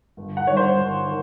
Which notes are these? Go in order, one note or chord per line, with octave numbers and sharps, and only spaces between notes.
G1
F#5
G2 D#3 C#5
C5
G1
D#3